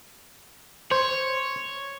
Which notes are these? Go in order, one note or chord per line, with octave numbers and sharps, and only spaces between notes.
C5 C#5